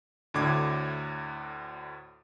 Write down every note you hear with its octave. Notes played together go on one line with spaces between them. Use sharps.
D2 A2 D3 D6 G#6